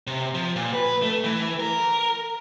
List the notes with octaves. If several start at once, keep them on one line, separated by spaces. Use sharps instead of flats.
C3
F3
A#2
B4
A3
E3
A#4